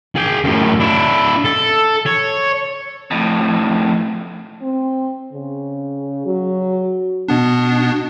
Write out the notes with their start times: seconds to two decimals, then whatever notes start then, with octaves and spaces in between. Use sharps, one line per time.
0.16 G#4 G5
0.44 F#2 A2
0.80 D4 E4
1.44 A4
2.06 C#5
3.11 F2 A2
4.62 C4
5.33 C#3
6.26 F#3
7.29 B2 B3 D4